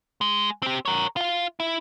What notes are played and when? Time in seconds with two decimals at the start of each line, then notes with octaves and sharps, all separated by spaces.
0.21 G#3
0.63 C4 G4
0.85 A#4 C#5
1.16 F4 F5
1.60 E4